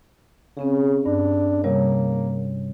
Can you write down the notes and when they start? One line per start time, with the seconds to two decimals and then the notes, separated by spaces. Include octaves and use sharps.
0.57 C#3 C4 C#4 G#4
1.06 G2 D4
1.64 C3 G3 A#3 C#5